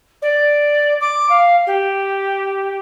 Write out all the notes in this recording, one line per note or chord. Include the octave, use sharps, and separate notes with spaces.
D5
D6
F5
G4